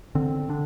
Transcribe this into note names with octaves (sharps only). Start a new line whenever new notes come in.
D3 C4
D3 D4